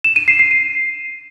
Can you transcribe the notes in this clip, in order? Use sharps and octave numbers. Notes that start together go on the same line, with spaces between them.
E7
D#7
C7
C7
D#7